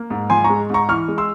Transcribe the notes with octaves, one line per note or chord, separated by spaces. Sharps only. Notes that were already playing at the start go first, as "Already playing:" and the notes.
Already playing: A#3
G#2
F3 G#5 C6
A#5 C#6
G#3
G#2 A#5 C#6
E3 C#6 F6
G#3
C6 E6